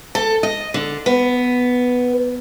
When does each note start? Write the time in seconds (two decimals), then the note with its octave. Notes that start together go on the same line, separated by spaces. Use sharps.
0.15 A4
0.43 D#5
0.74 D3
1.06 B3